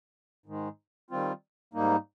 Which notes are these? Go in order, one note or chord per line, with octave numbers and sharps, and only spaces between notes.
G#2 D#3 G#3
D#3 G3 C4 F4
G#2 G3 A#3 D#4